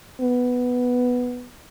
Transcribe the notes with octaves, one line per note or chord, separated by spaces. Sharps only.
B3